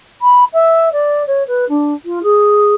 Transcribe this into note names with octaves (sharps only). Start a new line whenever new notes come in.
B5
E5
D5
C#5
B4
D4
F4
G#4